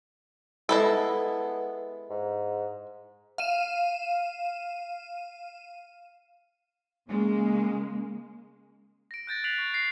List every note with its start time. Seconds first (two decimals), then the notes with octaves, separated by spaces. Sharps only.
0.69 G#3 B3 E4 A4
2.10 G#2
3.38 F5 D#7 E7
7.09 C#3 G#3 A#3
9.11 A#6 D7
9.27 F#6 G6 A6 A#6
9.44 F#6 B6 C7 D7 F7 F#7
9.58 C#6
9.74 A#6 C7 C#7